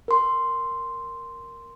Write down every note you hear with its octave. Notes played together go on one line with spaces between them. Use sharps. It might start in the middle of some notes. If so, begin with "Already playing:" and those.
A#4 C6